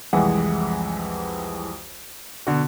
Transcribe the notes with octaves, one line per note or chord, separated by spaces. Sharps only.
C2 F2 E3 G#3 F#5 G#5
B2 D3 F#4